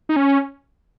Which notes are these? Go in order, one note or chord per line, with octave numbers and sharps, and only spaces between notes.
D#4
C#4